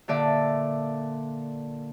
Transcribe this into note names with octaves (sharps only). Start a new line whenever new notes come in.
A#2 D3 D5 E5